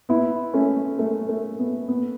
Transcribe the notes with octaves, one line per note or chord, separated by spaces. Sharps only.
B3 E4
A3 C#4
A3
A3
B3
B3